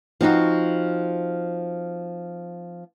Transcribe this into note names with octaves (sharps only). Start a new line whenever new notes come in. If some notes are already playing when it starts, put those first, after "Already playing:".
F3 C4 D#4 F#4